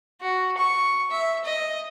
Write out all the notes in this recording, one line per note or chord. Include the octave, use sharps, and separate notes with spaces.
F#4
C#6
E5
D#5